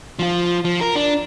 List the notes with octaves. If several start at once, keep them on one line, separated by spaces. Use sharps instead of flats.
F3 F4
F3
A#4
D4